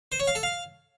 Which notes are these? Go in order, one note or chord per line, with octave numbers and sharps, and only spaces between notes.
C5
C#5
F5
A4
F5